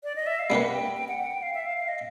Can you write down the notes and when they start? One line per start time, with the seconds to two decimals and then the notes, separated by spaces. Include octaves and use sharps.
0.03 D5
0.15 D#5
0.26 E5
0.39 F5
0.50 G3 A#3 D4 G4 B4 F#5
0.73 G5
0.96 G5
1.08 F#5
1.19 F#5
1.31 G5
1.42 F5
1.54 E5
1.66 F5
1.77 F5
1.88 D#5